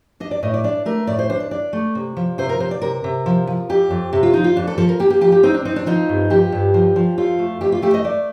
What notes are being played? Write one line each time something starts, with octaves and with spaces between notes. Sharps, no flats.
D4 D#5
D5
A2 D#5
D5
D4 D5
A3 A#4
A2 D5
C5
D4 C5
D5
D4 D5
A3
C3
F3
C3 C5
A#4
C3 C5
D5
C3 A#4
C3
F3
F3
F2 G4
F2
C3 G4
F4
F3 D#4
F4
F2 D4
A4
F3 A4
A#4
A#3 G4
G4
F3 G4
G4
C4 D#4
D4
C4 D#4
D4
F3 D#4
G2
F3 G4
G2
F3
F3
F2 F4
A3
F2 G4
F4
A3 G4
D#5
A3 D5